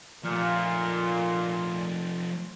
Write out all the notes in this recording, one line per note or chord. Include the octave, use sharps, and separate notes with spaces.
A#2 F3 A3